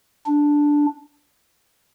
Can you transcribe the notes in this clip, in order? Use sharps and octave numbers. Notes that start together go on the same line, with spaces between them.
D4